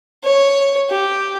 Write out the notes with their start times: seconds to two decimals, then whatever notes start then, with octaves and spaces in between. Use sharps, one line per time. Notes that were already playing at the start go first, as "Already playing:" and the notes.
0.24 C#5
0.89 G4